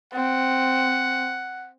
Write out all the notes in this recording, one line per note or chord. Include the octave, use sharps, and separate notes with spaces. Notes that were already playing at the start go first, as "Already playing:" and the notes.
C4 F#5